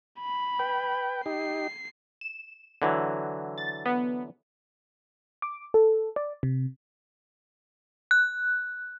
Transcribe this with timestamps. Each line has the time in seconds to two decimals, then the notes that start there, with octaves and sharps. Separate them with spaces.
0.21 B5
0.59 B4 G5
1.26 D#4 G4 C7
2.21 E7
2.82 D3 E3 F#3
3.58 A6
3.85 B3
5.42 D6
5.74 A4
6.16 D5
6.43 C3
8.11 F#6